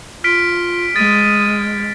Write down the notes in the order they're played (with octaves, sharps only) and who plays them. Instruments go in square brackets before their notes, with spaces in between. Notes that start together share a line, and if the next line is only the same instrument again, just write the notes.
[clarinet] F4 [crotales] F6 B6 D7
[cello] G#3 [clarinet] D#6 [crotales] A6